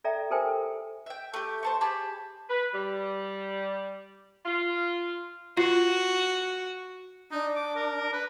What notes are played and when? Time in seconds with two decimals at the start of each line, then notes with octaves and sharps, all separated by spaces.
0.04 A4 D5 E5 G5 A#5
0.30 G4 A4 A#4 C5 G5 G#5
1.06 E5 G5
1.34 A3 G4
1.63 C5 A5 C#6
1.81 G4 G#4 A5 B5
2.49 B4
2.73 G3
4.45 F4
5.57 F4 F#4
7.31 D4 D#4
7.55 D6
7.76 A#4
8.13 B4